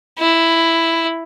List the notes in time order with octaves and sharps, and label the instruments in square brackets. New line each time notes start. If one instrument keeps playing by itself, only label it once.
[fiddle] E4